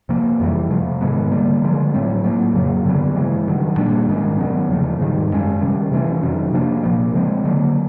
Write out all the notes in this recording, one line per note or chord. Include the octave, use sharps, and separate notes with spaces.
C3 F3 A#3
F2 C3 E3 G3
C3 F3 A3
G#2 D#3 G#3 B3
D3 G3 A#3
D3 F3 G#3
A2 F#3 A3 C4
A2 F#3 A#3
F2 C#3 F#3 A#3
G2 D3 F#3 B3
C#3 E3 G#3
G2 D#3 F#3
A#2 G3 A#3 D4
G#2 D#3 G#3 C#4
C3 D#3 F#3 B3
E2 C#3 F3 A3
G#2 D#3 G3
F#2 D#3 G#3 C#4
C3 D#3 G3
C3 E3 A3 C#4
F2 C3 D#3 F#3
C3 F3 A#3 D4
A#2 F3 A#3
C#3 F3 G#3 C4
D3 F#3 A#3